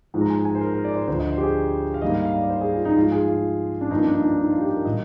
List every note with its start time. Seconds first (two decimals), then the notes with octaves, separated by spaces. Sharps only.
0.14 G#2 F3 G#3
0.21 A#5
0.30 G#5
0.45 G#5
0.55 C5
0.60 A#4
0.73 A#4
0.84 D5
0.96 C5
1.07 D2 D3 F3 C5
1.19 D#5
1.32 C5
1.38 G4
1.43 G#4
1.94 F5
2.02 G#2 G3 A#3 D#5
2.14 F5
2.25 F5
2.37 D5
2.49 C5
2.61 G#4
2.73 F4
2.85 D#4
2.97 G#2 F3 G#3 F4
3.12 G#4
3.28 F4
3.81 D4
3.91 G2 F3 A#3 D#4
4.03 D4
4.14 D#4
4.26 D4
4.38 D#4
4.50 F4
4.61 G4
4.73 A#4
4.85 A#2 G3 A#3 D#5